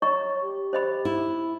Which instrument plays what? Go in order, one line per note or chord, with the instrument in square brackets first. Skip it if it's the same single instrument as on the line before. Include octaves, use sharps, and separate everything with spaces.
[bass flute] C#5 [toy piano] D#5 A#5 C#6
[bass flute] G4
[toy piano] C5 D#5 B5
[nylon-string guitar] E4